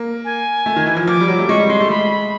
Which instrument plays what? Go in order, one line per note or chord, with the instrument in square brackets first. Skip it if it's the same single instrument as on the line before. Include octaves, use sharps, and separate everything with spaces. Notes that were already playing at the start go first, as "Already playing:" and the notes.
Already playing: [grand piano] A#3
[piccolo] G#5
[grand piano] A3
D#3
E3
F3
[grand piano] F3 [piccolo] D6
[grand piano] G3
F#3
A3
[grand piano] G#3 [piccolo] C#6
[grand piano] G3
[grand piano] G#3 [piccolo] C6
[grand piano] A3
[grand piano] G#3 [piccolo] B5
[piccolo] B5